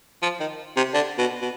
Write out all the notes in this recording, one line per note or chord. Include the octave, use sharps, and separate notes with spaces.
F3
D#3
C3
D3
B2
B2